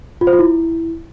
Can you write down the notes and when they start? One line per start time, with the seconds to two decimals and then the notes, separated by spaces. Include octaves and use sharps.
0.21 F4
0.27 C5
0.33 F4
0.39 E4